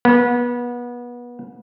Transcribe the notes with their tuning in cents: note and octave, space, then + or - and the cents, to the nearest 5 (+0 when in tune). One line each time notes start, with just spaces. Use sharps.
B3 -25